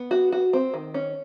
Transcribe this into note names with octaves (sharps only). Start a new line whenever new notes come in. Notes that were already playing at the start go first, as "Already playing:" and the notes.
Already playing: B3
F#4
F#4
C4
D#3
C#4